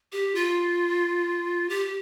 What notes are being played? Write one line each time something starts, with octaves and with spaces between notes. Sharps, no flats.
G4
F4
G4